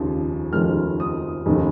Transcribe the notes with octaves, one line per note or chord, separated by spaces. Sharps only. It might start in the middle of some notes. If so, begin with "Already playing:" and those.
Already playing: F1 D#2 C#3 F3
F1 D#2 C#3 F3 F6
D#6
F1 D#2 C#3